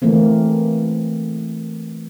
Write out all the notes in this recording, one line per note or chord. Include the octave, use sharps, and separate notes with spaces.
E3 A3 A#3 C4